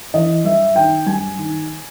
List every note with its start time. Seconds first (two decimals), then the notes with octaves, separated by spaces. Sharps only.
0.14 E3 D#5
0.44 G2 E5
0.76 D#3 G5
1.06 G2 G#5
1.38 D#3